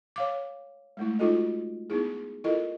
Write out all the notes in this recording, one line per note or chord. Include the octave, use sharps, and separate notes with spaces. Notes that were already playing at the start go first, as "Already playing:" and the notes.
C#5 F5 D6
G#3 A3 E4
D#4 F4 F#4 A4 D#5
B3 D#4 E4 G#4
E4 F4 A4 A#4 D#5